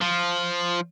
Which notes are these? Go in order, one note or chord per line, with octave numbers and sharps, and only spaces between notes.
F3